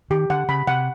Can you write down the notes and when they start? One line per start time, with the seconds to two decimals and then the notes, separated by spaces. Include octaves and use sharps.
0.10 D#3 G4
0.30 D3 F#5
0.49 C#3 B5
0.67 C3 F#5